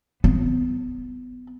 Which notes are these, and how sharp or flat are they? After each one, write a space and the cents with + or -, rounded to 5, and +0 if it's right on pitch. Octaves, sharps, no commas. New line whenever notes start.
B3 +20